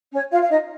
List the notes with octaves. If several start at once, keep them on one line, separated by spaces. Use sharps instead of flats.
C#4 C#5
F4 F5
F5
D#4 D#5